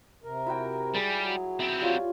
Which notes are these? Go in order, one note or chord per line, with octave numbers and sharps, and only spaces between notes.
C3 A#4
E4 F#4 G5
G3 G#4
F#3
B3 C4 E5
G3 F4 C#5